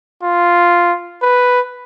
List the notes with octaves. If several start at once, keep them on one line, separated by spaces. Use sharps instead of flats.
F4
B4